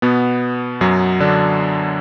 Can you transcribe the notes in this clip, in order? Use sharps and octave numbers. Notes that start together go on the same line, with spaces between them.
B2 B3
F#2 F#3
D3 D4